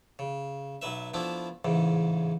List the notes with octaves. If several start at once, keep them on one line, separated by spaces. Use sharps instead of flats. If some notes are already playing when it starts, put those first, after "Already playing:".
C#3
B1 F#3 B4 E5
F3 A3 B3 D4 E4
A1 E2 G#2 C#3